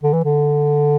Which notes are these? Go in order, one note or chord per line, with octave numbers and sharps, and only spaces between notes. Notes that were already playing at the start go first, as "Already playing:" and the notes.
D3
E3
D3